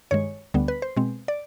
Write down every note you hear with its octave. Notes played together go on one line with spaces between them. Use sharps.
G2 D#3 G#3 C#5
D2 D3 G3 B3
B4
C5
B2 G#3 C4
D5